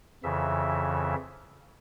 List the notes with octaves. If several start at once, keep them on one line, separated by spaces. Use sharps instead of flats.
F2 C#3 E3 E5